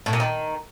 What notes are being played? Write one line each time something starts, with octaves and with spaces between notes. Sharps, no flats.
A2
A#2
D#3